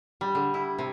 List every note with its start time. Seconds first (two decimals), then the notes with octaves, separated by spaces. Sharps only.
0.21 G3
0.35 D3
0.54 E4
0.79 C3